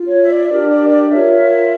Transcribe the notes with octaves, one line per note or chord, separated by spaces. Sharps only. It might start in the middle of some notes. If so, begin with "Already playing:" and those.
Already playing: F4
C#5
E5
D5
E5
D4 G4 A#4 D5
D5
D5
F4 A#4 C#5 E5